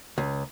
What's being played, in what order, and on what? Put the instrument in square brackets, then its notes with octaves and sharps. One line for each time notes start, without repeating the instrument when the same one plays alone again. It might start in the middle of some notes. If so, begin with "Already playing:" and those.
[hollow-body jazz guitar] C#2